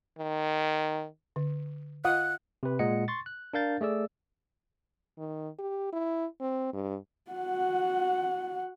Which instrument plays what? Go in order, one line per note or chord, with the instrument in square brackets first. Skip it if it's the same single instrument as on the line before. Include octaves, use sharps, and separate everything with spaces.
[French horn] D#3
[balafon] D3
[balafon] F4 D#5 [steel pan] F5 F#5 D#6 [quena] F#6
[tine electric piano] C3 B4
A#2 G#3 D#5 F#5 C#7
C6 C#6 A6
F#6
D4 A#4 F5 G6 A6
A3 G#4 D5 E6
[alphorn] D#3
G4
E4
C4
G2
[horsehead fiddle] F#4 F#5